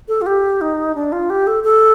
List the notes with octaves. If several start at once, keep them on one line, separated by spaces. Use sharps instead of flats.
A4
F4
G4
D#4
D4
F4
G4
A4
A4